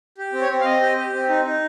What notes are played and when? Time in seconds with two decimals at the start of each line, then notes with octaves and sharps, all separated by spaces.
0.18 G4
0.33 C4
0.41 C#5
0.49 C4
0.60 F5
0.65 C4 D#5
0.82 G4
0.97 G4
1.13 C4
1.29 D#4
1.45 D#4